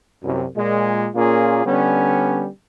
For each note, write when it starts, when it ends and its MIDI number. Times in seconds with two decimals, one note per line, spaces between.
0.24 0.45 36
0.24 0.45 42
0.56 1.08 46
0.56 1.08 56
1.15 1.65 46
1.15 1.65 58
1.15 1.65 61
1.15 1.65 65
1.15 1.65 68
1.65 2.47 50
1.65 2.47 55
1.65 2.47 59
1.65 2.47 61